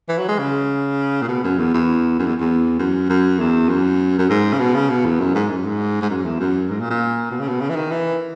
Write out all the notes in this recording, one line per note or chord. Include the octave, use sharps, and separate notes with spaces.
E3
F#3
G#3
C#3
A#2
B2
F#2
E2
E2
F#2
E2
E2
F#2
F#2
E2
F#2
F#2
G#2
C#3
B2
C#3
B2
E2
F#2
G#2
F#2
G#2
G#2
F#2
E2
F#2
G#2
A#2
A#2
B2
C#3
B2
C#3
E3
D#3
E3